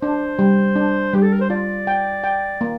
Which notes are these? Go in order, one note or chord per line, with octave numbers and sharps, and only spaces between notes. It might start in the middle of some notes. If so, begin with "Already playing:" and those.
D4 C5
G3
D4
G3 G4
A4
A#4
C5
F4 D5
G5
G5
A#3